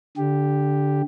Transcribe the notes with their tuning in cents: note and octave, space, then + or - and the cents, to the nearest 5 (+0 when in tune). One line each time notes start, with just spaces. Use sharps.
D3 -15 G4 +0